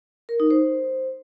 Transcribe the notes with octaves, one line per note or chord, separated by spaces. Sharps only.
A#4
D#4
C5